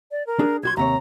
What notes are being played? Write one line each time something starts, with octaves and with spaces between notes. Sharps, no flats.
D5
A#4
D4 G#4
B1 F#4 C6 G#6
D#2 C3 C#5 A#5